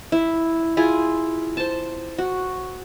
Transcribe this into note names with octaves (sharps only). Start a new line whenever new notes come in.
E4
E4 F4 G#4
C5 A5
F#4